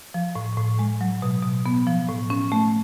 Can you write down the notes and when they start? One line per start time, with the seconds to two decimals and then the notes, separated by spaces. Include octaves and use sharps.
0.14 F3
0.35 A2
0.57 A2
0.79 G#3
1.01 F#3
1.22 B2
1.43 B2
1.66 B3
1.87 F3
2.09 A2
2.30 C#4
2.52 A3